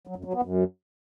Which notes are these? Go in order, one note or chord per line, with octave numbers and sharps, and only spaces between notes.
F#3
F#2
F#3
B3
F#2